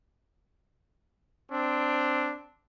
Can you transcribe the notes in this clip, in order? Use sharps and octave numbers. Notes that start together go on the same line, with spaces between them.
C4 D4